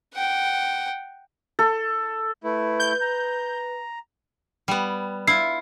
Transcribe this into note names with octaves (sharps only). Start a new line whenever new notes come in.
F#5 G5
A4
A3 E4 B4
G6
A#5
G3 B3
E4 F4 C7